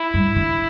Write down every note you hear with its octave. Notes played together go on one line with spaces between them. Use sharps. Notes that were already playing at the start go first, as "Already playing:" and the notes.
Already playing: E4
G2
D3